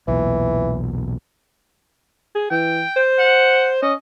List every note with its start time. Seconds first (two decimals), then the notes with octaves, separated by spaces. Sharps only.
0.08 B1 E2 A#2 E3
2.35 G#4
2.51 E3 G5
2.96 C5
3.19 F#5
3.82 C#4 D#5